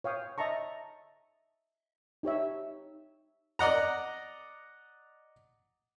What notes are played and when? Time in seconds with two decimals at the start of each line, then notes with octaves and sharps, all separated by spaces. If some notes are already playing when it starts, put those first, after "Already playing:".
0.04 C#5 F5 G5 D#6
0.38 D#5 E5 A5 A#5 C#6
2.23 D#4 G4 C#5 E5
3.59 D5 D#5 F#5 A#5